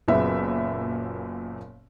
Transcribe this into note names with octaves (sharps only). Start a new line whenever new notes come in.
F#1 F#2 A#2 B3 E5